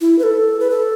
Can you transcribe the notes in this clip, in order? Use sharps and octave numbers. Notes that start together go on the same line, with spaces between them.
E4
B4
A4
B4
A4